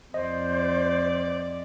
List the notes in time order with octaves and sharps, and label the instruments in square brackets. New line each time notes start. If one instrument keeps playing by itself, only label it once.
[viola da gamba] F2 D5 [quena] C5 [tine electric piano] D#5